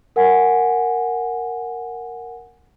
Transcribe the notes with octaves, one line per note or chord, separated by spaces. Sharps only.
A#4 F#5 G#5